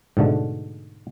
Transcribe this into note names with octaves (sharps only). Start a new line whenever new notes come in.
G#2 B2 D3 A3